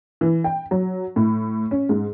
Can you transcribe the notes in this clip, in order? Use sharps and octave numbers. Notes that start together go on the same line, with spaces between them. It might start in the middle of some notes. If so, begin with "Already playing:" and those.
E3
G5
F#3
A2
C#4
G#2